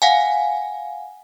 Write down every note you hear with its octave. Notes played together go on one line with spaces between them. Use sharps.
F5 F#5 G#5